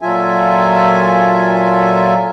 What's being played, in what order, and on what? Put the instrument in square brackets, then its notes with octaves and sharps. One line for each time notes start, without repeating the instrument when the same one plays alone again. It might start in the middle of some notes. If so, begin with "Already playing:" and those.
[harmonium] A#2 F#3 F4 A4 E5 G#5